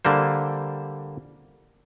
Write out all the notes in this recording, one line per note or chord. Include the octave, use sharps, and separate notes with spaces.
D3 G3 A#3 C5